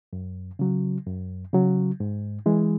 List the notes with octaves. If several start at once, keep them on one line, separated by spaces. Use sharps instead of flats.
F#2
C#3 F#3
F#2
C#3 F#3
G#2
E3 G#3